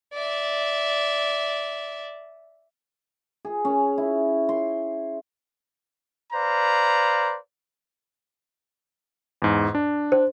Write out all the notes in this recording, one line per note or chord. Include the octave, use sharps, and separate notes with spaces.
D5 E5
G#4
C#4
E4
C6
B4 C5 D5 F5 A#5
E2 G#2
D4
C5